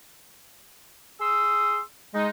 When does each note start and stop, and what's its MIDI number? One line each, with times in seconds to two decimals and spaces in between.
1.20 1.80 68
1.20 1.80 84
1.20 1.80 87
1.20 1.80 88
2.14 2.27 56
2.14 2.27 63